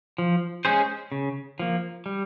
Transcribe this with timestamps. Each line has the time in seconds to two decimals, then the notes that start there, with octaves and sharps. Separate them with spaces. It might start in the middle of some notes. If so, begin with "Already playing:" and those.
0.18 F3
0.65 G#3 C#4 G#4 C5
1.12 C#3
1.60 F3 A#3
2.06 G3